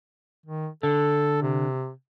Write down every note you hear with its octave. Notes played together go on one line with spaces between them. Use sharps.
D#3
D3 A4
C3